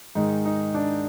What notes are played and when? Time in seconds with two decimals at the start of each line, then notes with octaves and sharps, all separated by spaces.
0.15 G#2 D#3 G#3 D#4
0.45 D#4
0.74 D4